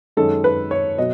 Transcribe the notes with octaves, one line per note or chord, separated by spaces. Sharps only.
F#2 D#3 G#3 C#4 A4
B4
C#5
B2 F#3 D#5